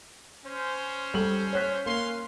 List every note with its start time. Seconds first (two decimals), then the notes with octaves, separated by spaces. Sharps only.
0.45 C#4 C5
1.14 G3 A4 F#7
1.53 C#5 F#6 B6
1.86 A#3 C#4 F5 C6